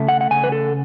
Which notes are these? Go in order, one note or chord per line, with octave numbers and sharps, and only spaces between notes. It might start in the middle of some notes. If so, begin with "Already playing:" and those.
Already playing: C#3 A3
F#5
F#5
C#3 G#5
B4
A4